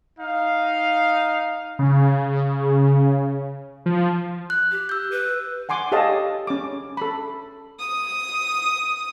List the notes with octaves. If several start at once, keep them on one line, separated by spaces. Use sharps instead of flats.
D#4 F5
C#3
F3
F#6
G4
E6 G6
B4
F#5 G#5 C6 D6
G4 A4 C#5 D#5 F5 A5
C#4 D6
A4 B5
D#6